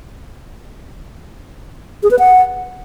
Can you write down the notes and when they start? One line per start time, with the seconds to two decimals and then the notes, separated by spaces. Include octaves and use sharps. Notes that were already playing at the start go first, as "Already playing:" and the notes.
2.03 G#4
2.11 B4
2.19 F#5